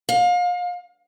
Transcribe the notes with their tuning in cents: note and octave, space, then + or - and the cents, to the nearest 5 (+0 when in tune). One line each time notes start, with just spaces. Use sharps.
F5 +35